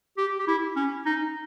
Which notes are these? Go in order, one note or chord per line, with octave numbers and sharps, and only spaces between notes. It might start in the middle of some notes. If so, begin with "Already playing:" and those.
G4
G4
E4
C#4
D#4